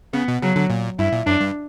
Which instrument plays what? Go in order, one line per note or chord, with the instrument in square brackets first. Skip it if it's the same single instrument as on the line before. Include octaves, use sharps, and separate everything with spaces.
[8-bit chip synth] C#3 [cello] B3
[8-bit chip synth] B2
[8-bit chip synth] C#3 [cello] F#3
[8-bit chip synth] D3
A#2
[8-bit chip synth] G2 [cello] E4
[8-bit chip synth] A#2
[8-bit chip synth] F#2 [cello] D4
[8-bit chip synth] G2